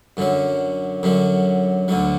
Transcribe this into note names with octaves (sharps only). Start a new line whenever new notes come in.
F#2 D3 F#3
F#2 D3 F#3
D2 D3 F#3